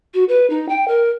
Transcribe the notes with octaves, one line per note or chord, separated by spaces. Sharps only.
F#4
B4
D#4
G5
A#4